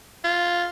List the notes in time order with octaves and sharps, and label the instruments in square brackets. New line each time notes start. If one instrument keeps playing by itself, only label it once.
[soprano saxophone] F4